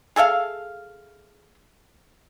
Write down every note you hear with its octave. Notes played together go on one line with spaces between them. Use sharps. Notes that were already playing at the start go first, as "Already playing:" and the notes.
G#4 A4 E5 F5